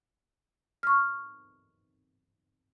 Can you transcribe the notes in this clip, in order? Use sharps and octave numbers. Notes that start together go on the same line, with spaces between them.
C#6 F6